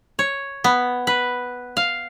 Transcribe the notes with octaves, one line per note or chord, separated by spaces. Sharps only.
C#5
B3
B4
F5